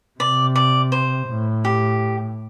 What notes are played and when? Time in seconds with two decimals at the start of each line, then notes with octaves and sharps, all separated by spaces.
0.20 C3 D5
0.56 D5
0.92 C5
1.28 A2
1.65 G4